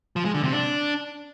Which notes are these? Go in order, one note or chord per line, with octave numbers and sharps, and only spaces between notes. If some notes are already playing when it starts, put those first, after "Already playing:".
F3
G#3
D3
C3
D4